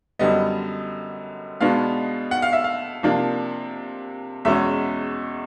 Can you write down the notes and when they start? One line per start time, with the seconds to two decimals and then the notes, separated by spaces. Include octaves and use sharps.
0.19 F#2 D3 G3 B3 D#5
1.61 B2 G#3 B3 D4 F5
2.31 F#5
2.42 F5
2.53 E5
2.64 F5
3.03 C3 F3 A#3 D4
4.45 E2 B2 G#3 C#4 E5